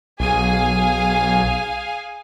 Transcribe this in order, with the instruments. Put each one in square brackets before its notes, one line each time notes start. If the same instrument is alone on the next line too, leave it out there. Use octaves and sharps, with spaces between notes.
[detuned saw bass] B1 [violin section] G#4 F5 G#5